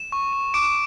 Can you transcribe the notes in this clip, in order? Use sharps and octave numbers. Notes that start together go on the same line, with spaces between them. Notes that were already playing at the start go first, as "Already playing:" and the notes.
Already playing: E7
C#6
C#6
D6 D7